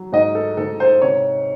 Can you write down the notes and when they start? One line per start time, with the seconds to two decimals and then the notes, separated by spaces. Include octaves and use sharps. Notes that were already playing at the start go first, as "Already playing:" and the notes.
Already playing: F#3
0.12 G#2 D#5
0.35 A4
0.57 G#2 A4
0.80 C5
1.02 C3 C#5